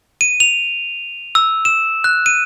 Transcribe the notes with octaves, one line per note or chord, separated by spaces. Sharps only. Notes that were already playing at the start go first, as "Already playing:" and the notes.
D#7
F7
E6
E7
F#6
D#7